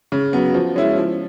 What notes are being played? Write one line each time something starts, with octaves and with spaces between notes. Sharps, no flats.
C#3
F#3 B3
F3
G#3 C#4 E4
F3